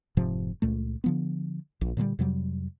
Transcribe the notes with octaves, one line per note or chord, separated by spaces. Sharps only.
F1 G#2 C3 F3
C#2 A#2 A3
D3 F3 B3
A#1
A#2 D3 F3 G3
F2 C3 F#3 G3